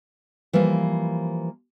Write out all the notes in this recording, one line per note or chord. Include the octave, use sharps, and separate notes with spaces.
E3 F3 G3 A#3